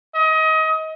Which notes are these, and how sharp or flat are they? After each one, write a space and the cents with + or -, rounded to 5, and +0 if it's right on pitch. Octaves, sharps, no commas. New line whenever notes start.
D#5 +25